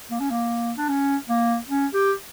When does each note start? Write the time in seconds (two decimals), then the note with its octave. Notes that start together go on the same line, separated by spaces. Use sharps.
0.11 A#3
0.20 C#4
0.31 A#3
0.77 D4
0.89 C#4
1.29 A#3
1.68 C#4
1.94 G4